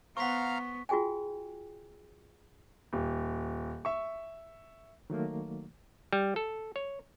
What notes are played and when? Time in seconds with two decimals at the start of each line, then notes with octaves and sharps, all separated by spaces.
0.17 B3 C5 F5 F#5 A#5 C#6 F6 B6
0.89 F4 F#4 G#4 G5 G#5
2.93 D#1
3.85 E5 C#6
5.10 D#3 F#3 A3 A#3
6.13 G3
6.36 A4
6.76 C#5